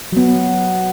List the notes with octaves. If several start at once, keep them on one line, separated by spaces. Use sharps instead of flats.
F#3 B3